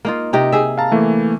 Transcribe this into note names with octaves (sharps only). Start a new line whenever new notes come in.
A#3 D#4 F4
C3 D#4 G4
G#4 E5
F5 A5 A#5
E3 A3 A#3